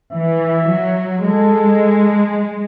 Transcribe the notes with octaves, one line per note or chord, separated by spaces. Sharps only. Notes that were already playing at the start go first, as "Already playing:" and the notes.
E3 E5
F#3
G#3 A4